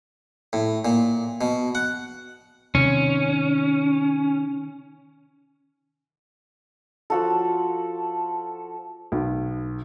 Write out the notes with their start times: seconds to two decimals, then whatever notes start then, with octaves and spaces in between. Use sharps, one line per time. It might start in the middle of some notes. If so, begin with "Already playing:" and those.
0.53 A2
0.85 A#2
1.41 B2
1.75 F#5
2.75 C3 D#3 C#4
7.10 F3 F#4 A4
9.12 B1